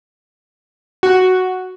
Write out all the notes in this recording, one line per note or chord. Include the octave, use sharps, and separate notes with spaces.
F#4